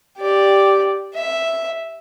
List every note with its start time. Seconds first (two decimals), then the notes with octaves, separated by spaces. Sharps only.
0.18 G4 D5
1.15 E5